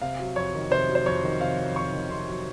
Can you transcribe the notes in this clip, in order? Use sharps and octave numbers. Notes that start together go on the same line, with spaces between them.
C3 F5
F#3
F2 C#5
D#3
C3 C5
F#3
C5
F2 C#5
D#3
C3 F5
F#3
F2 C#6
D#3
C3 C6
F#3